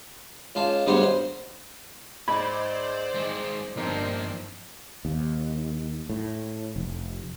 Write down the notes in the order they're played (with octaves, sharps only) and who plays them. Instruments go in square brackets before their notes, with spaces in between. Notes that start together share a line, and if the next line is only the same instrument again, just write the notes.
[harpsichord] C#2 F4 A5
D2 G2 G#3 B3 C5 C#5
C5
[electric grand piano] G#2 D#5 G#6 [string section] C5 D5 [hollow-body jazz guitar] B5
[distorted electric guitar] G#3 C4
[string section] G1 C4 D4 [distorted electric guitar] F3 A#3 [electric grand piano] D#4 A#4
[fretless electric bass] D#2
A2
F1